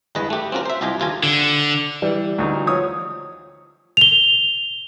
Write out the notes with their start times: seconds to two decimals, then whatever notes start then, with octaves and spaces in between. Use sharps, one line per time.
0.15 G1 E2 G#3 B4 D#5
0.30 A3 G4
0.52 C4 C#4 F4 F#4 A#4
0.65 C5 E5
0.81 C2 F4 G4 D#5 G5 G#5
1.00 D#2 F3 F4 A4 G#5 A#5
1.23 D3
2.02 E3 G3
2.38 D2 D#4
2.66 F3 C#5 D#6
3.97 F7 G7